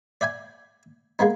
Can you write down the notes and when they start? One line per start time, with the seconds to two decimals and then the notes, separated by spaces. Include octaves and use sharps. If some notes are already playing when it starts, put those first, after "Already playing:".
0.21 D5 E5 G5 G#5
1.19 G#3 A#3 B3 D#4